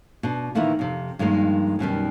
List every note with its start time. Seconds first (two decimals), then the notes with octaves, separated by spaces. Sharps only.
0.23 B2 D4
0.55 A#2 D#3 E3 A#3 B3 E4
0.79 F2 C3
1.19 G2 D#3 F3 G#3 A#3 C4
1.79 F#2 B2 D#3 G3